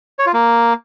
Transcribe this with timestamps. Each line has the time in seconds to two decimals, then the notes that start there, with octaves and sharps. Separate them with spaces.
0.19 C#5
0.26 F4
0.34 A#3